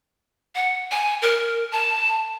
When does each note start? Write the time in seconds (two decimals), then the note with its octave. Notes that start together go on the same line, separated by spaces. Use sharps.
0.55 F#5
0.91 G#5
1.22 A#4
1.71 A5